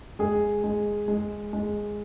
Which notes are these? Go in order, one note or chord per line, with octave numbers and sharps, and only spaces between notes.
G#3 G#4
G#3
G#3
G#3